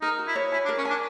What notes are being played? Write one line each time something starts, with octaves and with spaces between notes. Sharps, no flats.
D#4 A#4
F#4
E4
C#5
E4 G#5
D4
A#4
C#4
D4 G#5